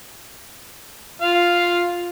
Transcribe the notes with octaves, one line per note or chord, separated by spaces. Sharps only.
F4 F5